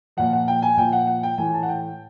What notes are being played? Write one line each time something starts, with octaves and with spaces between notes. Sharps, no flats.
A#2 F3 F#5
F#5
G5
G#5
A#2 F3 G5
F#5
F#5
G5
A2 E3 G#5
A5
F#5
G5